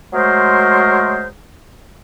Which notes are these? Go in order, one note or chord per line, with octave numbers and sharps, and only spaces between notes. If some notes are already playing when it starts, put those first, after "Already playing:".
F#3 G#3 A3 G#4 A#4 C5